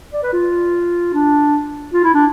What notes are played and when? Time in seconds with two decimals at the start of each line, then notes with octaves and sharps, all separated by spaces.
0.13 D5
0.23 B4
0.33 F4
1.14 D4
1.94 F4
2.04 E4
2.14 D4